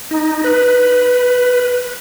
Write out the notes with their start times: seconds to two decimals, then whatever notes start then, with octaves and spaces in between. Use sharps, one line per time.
0.11 D#4
0.44 B4